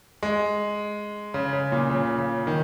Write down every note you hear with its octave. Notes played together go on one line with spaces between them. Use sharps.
G#3
C#3
C#3
A#2
C#3
C#3
D#3